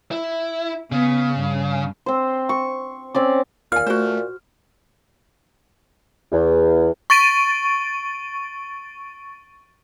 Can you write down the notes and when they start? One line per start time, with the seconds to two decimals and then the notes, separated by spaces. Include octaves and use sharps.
0.11 E4
0.92 C#3 B3
1.39 G2
2.06 C4 C5
2.49 C#6
3.15 C4 C#4 D5
3.72 D#2 A#2 F4 G#5 F6
3.86 A3 F#4 C5
6.32 E2
7.10 C#6 A6 D7 D#7